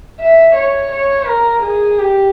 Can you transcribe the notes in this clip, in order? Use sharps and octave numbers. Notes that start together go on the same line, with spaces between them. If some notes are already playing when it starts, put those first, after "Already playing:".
E5
C#5
C#5
A#4
G#4
G4